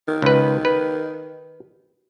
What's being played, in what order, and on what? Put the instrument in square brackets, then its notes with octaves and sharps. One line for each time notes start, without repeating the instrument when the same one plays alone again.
[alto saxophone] D#3
[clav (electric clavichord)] C#2 B4
B4